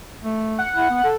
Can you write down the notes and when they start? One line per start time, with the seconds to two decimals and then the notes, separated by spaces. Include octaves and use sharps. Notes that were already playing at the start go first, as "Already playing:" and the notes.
0.24 A3
0.59 F#5
0.76 E4
0.90 B3
1.04 A4